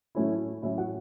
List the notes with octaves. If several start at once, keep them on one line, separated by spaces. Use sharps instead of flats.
A2 F#3 A3 C#4 E4
A2 F#3 C#4 E4 E5
F#4 F#5